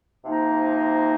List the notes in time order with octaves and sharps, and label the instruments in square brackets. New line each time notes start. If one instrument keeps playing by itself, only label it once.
[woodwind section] C3 F3 A#3 D#4